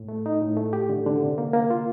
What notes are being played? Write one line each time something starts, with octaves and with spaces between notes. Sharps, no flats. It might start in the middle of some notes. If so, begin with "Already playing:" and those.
Already playing: A2
A3
D#4
A2
A3
G4
D3
D3
C3
A#3
A#3
F4